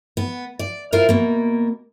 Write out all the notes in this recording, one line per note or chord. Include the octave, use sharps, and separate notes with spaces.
B3
D5
E4 F4 A#4 C5
B2 A#3